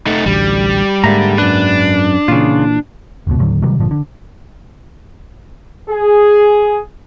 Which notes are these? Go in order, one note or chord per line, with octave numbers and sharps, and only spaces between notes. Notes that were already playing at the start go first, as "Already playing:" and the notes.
A3 D#4
A1 D2 G3
G#2 D3 G#3 A#3 E5 A#5
F#2 D4 B4
A#2 C#3 E3 F4
F1 C#2 B2
D#2 A2 D3 F#3
C3 D#3 F#3 G3
G1 A#2 D3 F3
D3
G#4